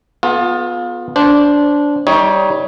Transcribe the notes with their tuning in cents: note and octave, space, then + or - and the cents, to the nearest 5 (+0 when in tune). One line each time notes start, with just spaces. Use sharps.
B3 +0 F4 +25 A4 -45
D4 -15 C5 +0
G3 +0 D#4 +25 C#5 +0